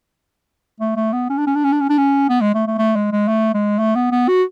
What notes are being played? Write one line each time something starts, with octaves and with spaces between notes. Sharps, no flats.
A3
A3
B3
C#4
D4
C#4
D4
C#4
D4
C#4
D4
C#4
B3
G#3
A3
A3
A3
G#3
G#3
A3
G#3
A3
B3
B3
F#4